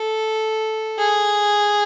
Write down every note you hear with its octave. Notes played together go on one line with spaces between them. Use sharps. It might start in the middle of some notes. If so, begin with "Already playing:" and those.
Already playing: A4
G#4